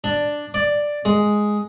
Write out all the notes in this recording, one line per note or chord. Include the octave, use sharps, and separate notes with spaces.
D4
D5
G#3